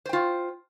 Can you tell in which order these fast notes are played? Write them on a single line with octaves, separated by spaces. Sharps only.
C5 G5 F4